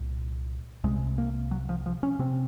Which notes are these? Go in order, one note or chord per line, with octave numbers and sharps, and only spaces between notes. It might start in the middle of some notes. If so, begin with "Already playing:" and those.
Already playing: C2 A#2
C2 C3 G#3
A#3
F#3
F3
F3
C#4
C3 C4